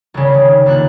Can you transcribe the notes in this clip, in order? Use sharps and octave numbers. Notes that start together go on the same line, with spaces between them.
C2 C#3
D#3
D#1 A#3 D4 F#6